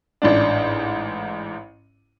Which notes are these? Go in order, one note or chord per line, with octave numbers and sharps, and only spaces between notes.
A1 G#2 D4